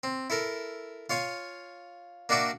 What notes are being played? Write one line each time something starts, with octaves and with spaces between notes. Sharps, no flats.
C4
E4 A4 A#4
F4 C#5 F5 G#5
A#3 D4 F#4 D5 E5